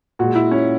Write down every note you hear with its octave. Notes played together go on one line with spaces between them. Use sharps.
A#2 G#3 F#4
E4
C#4